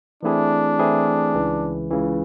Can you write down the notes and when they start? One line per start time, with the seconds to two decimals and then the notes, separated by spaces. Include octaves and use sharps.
0.23 E3 A3 C4 D4 E4 G#4
0.79 E3 A3 C4 E4 G#4
1.35 C#2 C#3 E3
1.91 C#2 C#3 E3